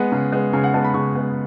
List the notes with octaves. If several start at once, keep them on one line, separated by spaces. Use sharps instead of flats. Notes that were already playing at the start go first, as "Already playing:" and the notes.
Already playing: G#3 B3 F#5
C#3
G#3 B3
C#3 G#5
F#5
G#3 B3 A5
B5
C#3 C#6
G#3 B3